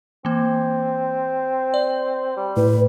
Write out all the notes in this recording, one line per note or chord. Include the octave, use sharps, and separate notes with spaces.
E3 A#3 C4
D5
G3
A2 B4